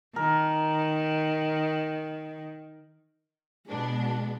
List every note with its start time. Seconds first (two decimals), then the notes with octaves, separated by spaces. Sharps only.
0.16 D#3 A#4
3.69 B2 G#3 D4